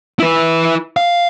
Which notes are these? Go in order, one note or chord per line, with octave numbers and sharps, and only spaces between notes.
E4 B4
F5